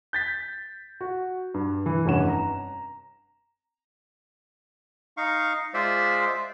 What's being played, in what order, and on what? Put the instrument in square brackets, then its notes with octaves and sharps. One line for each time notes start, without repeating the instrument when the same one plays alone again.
[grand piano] G6 A6 B6
F#4
G2
E3
F1 G2 C#4 F#5 E7
A#5
[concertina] D#4 F5 C#6
G#3 F4 C5 D5 E5